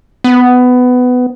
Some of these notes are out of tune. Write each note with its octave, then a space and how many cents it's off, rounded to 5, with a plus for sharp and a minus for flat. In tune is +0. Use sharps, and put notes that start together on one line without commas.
B3 +15